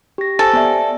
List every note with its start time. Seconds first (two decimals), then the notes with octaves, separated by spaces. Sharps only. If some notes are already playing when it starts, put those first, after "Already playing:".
0.18 G4 A#6
0.39 G4 A4 C5 G#5
0.53 B3 D5 E5